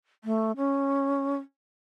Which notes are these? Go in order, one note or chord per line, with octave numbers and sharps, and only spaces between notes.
A3
C#4